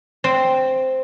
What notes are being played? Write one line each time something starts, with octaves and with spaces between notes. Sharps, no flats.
C4